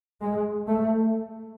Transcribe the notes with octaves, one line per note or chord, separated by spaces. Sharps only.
G#3
A3